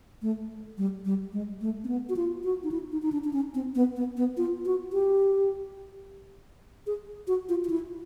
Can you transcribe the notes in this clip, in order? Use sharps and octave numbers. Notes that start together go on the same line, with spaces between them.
A3
G3
G3
G#3
A3
C4
B3
F#4
F4
F#4
D#4
E4
D#4
D#4
D4
D4
C#4
C4
B3
B3
B3
F4
F#4
G4
G#4
F#4
F4
F4
E4